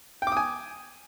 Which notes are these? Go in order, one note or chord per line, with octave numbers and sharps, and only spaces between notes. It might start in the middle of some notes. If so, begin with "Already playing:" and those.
G5 G#5 D6 D#6